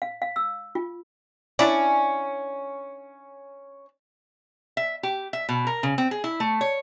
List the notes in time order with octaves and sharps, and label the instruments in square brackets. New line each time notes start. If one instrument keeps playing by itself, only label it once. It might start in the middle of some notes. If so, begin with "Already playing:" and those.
[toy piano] F5
F5
E6
F4
[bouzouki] C#4 [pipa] D4 E4 D5
[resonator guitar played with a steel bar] E5
G4
E5
B2
A#4
C#3
C4
G#4
E4
A3
C#5